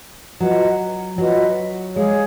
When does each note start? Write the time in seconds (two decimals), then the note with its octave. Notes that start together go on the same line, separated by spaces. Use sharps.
0.40 F#3 F4 B4 D#5 F#5
1.18 F#3 F4 B4 D#5 F#5
1.95 G#3 G#4 C#5 F5